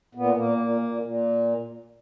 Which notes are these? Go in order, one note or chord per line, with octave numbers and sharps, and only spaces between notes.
A#2 B3
A#2 A#3
A#2
A#2
A#2